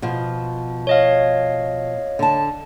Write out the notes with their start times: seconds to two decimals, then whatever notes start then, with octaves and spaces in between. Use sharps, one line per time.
0.02 B2 F3
0.87 C#5 D#5 F5
2.19 D3 A5